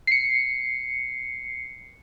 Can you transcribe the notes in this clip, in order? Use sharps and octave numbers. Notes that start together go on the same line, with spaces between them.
C7 C#7